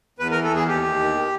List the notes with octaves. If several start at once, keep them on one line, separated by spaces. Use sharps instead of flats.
E2 B4
A#4
E3
A4
E2 G#4
D#2 G4
D#2
D#3